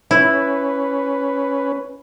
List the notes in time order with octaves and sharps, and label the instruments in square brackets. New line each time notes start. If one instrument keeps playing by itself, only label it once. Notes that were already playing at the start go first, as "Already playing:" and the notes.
[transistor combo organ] C#4 B4 [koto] E4